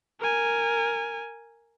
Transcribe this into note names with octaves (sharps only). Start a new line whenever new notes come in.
A#4 G#5